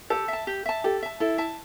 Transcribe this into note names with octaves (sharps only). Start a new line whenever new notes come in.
G4 A4
E5 A5
G4
E5 A5
G4 A4
E5 A5
E4 A4
E5 A5